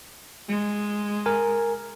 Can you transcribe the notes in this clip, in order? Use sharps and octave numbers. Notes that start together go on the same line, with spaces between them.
G#3
A#4 G#5